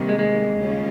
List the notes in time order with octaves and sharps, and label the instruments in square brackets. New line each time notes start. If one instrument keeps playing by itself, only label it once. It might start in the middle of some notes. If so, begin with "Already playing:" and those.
Already playing: [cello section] C3 D#3 G3 A#3
[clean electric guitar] G#3
G#3
[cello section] D#2 C#3 G3 C#4 F4